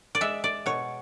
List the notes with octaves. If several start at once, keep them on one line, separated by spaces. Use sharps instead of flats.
D5
G#3 E5
D5
B2 C#5